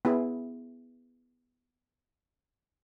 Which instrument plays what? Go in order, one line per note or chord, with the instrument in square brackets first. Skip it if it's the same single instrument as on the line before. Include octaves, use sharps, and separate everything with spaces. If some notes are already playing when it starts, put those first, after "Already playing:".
[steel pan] B3 E4 G#4